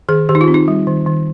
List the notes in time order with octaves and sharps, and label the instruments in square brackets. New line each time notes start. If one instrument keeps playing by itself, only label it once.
[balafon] D#3 G#4
D#3 G4
D#4
F4
C4
D#4
G3
D#3
D#3